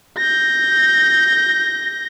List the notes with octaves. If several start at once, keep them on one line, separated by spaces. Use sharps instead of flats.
G6 A#6